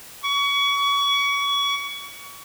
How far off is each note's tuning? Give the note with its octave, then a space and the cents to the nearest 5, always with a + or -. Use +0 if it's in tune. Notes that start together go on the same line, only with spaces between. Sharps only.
C#6 +30